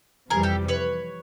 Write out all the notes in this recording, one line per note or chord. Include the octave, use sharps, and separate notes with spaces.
F2 C3 E3 G3 G#4 A#4
G4 A4
B4 C#5